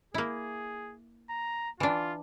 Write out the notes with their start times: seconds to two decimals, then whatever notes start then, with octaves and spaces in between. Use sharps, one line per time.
0.14 A#3 E4 G#4
1.30 A#5
1.80 E3 D4 F4